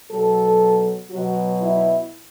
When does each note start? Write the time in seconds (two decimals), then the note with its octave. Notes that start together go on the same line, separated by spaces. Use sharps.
0.10 B2 F#3 A4
1.10 B2 F#3 F#4
1.60 E4